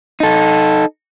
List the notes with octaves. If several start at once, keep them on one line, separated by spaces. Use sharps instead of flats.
D#4 A4